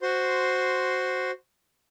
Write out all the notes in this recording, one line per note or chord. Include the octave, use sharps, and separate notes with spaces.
F#4 C5 C6